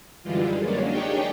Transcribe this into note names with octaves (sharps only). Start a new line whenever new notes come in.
F#2 D3 E3 G3 G#3 F4
F#3 G#3 A#3 C#4 D4
D4 D#4 G4 G#4 C#5 G5